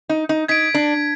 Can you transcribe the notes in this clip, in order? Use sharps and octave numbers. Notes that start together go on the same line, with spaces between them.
D#4
D#4
D#4 G#6 B6 D7
D4